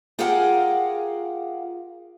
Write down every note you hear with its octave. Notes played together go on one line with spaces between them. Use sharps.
F4 G4 G#4 A#4 F5 F#5